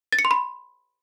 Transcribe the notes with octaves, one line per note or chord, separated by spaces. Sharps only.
A6
C#7
C6
B5